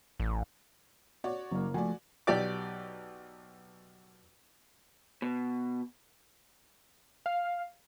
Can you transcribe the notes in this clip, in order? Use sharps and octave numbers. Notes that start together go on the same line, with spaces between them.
A1
F#4 C#5 D5
F#1 F#3 A#3
F3 A3 F#4 D5 G#5
B1 G4 D5 D6
B2
F5